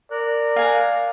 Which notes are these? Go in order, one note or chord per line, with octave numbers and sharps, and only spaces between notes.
A#4 D5 F#6
F5 G#5 A#5